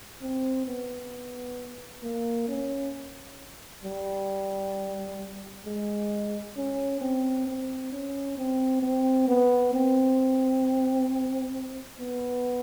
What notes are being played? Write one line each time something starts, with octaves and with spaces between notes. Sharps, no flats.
C4
B3
A#3
C#4
G3
G#3
C#4
C4
C4
C#4
C4
C4
B3
C4
B3